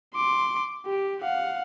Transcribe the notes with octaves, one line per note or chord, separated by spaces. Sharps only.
C6 D6
G4
F5 F#5